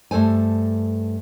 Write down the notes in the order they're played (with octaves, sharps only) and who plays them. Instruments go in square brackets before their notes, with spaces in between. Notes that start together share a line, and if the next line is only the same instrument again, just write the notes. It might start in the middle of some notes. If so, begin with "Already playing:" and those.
[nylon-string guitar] G2 A3 A4 C5 G#5